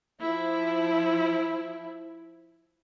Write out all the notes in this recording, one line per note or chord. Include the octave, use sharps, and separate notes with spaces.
F3 E4